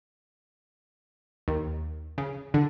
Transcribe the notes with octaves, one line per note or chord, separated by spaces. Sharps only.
D#2
C#3
D3